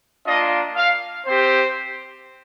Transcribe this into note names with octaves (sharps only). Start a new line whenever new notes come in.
A#3 D4 F4 D#5
F5
C4 G4 C5